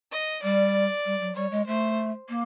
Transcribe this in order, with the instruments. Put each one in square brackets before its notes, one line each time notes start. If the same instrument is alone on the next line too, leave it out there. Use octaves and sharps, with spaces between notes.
[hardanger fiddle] D#5
[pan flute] G3 [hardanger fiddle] D5
[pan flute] G3
F#3
[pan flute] G3 [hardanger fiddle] C#5
[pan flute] G#3
[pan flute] A3 [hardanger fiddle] C5
[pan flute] A#3